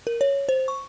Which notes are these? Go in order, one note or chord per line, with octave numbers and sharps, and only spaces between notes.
A#4
C#5
C5
C#6